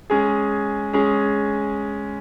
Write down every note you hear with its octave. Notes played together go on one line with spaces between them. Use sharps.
G#3 C#4 G#4
G#3 C#4 G#4